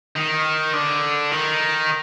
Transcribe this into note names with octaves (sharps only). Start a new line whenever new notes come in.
D#3
D3
D#3